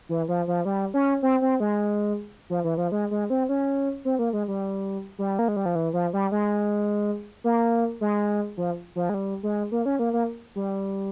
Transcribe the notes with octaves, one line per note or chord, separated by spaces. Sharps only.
E3
F3
F3
G3
C#4
C4
C4
G#3
F3
E3
F3
G#3
G#3
C4
C#4
C4
A#3
G#3
G3
G3
A#3
G#3
G3
F3
E3
F3
G3
G#3
A#3
G#3
F3
F3
G#3
G3
G#3
A#3
C#4
A#3
A#3
G3